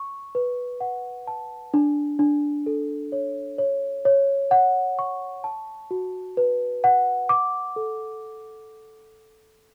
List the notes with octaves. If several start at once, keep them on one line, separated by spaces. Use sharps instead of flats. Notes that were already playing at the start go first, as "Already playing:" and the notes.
Already playing: C#6
B4
F#5
A5
D4
D4
A4
C#5
C#5
C#5
F#5
C#6
A5
F#4
B4
F#5
D6
A4